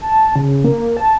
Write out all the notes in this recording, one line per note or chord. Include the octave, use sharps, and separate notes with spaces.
A5
C#3
A#3
A5